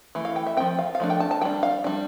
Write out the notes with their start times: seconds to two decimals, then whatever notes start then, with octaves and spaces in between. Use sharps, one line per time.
0.15 E3 A3
0.25 F5
0.36 G5
0.46 E5
0.57 C4 G5
0.60 F3
0.79 F5
0.95 F5
1.00 F3 A3 D4
1.10 G5
1.20 A5
1.31 A5
1.42 G3 D4 G5
1.63 F5
1.84 G3 D4